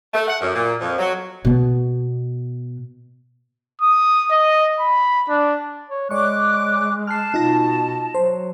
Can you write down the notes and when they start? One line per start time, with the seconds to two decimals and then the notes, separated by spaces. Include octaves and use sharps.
0.14 A3
0.28 F#5
0.41 F#2
0.55 A#2
0.81 F2
0.99 F#3
1.45 B2 B3
3.81 D#6
4.31 D#5
4.79 B5
5.29 D4
5.90 C#5
6.11 G#3 C#5 D5 C#6 D6 F#6
7.07 A5 F6 F#6 C7
7.34 B2 D#4 F4 A#6
8.15 F#3 C5